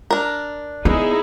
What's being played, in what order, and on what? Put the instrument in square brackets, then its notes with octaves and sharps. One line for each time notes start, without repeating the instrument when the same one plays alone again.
[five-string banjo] D4 A#4
[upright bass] B3 [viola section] D#4 E4 G#4